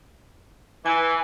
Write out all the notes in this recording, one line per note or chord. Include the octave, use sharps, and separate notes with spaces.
E3 G#5